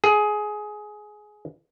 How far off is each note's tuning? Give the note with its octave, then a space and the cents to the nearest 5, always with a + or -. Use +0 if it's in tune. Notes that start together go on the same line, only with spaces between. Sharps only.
G#4 +15